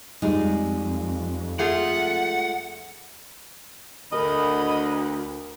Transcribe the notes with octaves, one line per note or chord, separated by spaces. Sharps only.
F2 G3 G#3 D#4
A3 F4 G#4 F#5
D2 A#4 D#5 B5